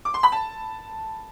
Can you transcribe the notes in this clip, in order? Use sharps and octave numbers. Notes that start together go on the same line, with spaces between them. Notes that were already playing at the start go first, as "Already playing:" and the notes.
D6
C6
B5
A5